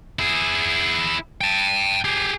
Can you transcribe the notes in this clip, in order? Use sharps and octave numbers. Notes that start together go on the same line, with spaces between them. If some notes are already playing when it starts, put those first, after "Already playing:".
E4 G#4
G5 A5
G4 G#4